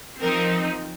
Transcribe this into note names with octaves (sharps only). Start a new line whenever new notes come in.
F3 C4 D#4 A#4